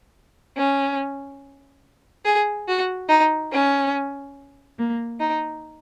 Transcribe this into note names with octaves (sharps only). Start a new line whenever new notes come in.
C#4
G#4
F#4
D#4
C#4
A#3
D#4